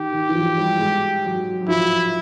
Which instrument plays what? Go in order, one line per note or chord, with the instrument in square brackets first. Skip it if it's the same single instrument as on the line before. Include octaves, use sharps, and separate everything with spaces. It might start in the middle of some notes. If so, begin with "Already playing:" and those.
Already playing: [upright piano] D#3 [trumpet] G4
[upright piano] D#3
E3
F3
G3
G#3
F#3
F#3
[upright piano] F3 [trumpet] E4